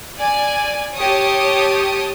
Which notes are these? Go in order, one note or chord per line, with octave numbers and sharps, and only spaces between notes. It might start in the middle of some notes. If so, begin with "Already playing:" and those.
D5 G#5
G4 C#5 A5 D#6